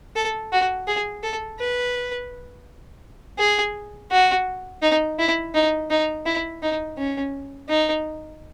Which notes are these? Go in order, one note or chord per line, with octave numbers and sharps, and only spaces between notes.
A4
F#4
G#4
A4
B4
G#4
F#4
D#4
E4
D#4
D#4
E4
D#4
C#4
D#4